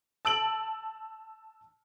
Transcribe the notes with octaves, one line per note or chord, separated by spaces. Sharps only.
A5 E6 D7 F#7